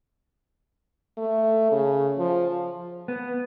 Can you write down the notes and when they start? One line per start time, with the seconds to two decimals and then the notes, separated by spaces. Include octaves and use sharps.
1.18 A3
1.72 C#3
2.18 F3
3.08 B3